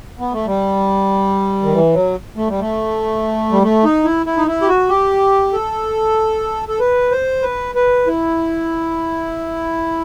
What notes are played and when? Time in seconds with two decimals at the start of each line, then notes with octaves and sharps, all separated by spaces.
0.19 B3
0.32 A3
0.46 G3
1.63 D#3
1.73 E3
1.94 F#3
2.37 A3
2.48 G3
2.60 A3
3.51 G3
3.62 A3
3.84 D#4
4.05 E4
4.26 E4
4.37 D#4
4.47 E4
4.62 G4
4.68 F#4
4.89 G4
5.53 A4
6.68 A4
6.80 B4
7.11 C5
7.42 B4
7.75 B4
8.07 E4